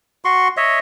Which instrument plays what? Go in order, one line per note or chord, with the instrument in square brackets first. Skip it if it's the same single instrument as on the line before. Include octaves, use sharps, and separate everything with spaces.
[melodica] F#4 C6 C#6
C#5 D#5 E5